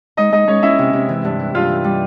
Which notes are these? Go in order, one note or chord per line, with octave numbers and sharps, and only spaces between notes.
G#3 D#4 D#5
G#3 D#4 D#5
G#3 C#4 C#5
C#4 E4 E5
C3
C3
E3
G2
E3
G2 F4 F5
E3
G3